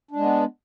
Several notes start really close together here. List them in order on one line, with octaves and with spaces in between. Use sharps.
D4 G#3 B3